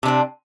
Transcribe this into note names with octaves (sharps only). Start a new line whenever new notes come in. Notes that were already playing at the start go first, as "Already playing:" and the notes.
C3 C4 D4